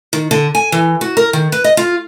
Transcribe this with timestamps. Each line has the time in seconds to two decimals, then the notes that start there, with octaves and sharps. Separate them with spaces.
0.13 D#3
0.31 D3
0.55 G#5
0.72 E3
1.01 F#4
1.17 A#4
1.33 D#3
1.52 B4
1.64 D#5
1.77 F4